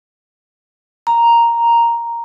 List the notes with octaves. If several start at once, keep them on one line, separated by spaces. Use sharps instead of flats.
A#5